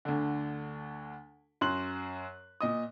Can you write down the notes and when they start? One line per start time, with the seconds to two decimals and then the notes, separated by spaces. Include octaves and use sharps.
0.05 D2 D3
1.61 F#2 C6 F#6 F#7
2.61 A#2 D#5 D#6